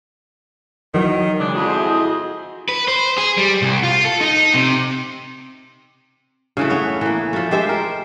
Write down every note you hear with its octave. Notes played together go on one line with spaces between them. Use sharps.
D#3 E3 F#3
C#3 G#3 D4
F2 E4 F#4 G#4
C5
D#5
B4
C5
G#4
G3
C2
F4
A4
D#4
C3
C#3 E3 A3
B3 C#5
E3 A#3
F3 A3
G#3 G4 C5 E5
A#4